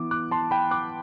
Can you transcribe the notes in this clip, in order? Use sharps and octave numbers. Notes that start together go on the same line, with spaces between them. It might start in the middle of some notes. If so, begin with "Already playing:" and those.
Already playing: E3 B3 D6
D6 F#6
A5 C6
G5 B5
D6 F#6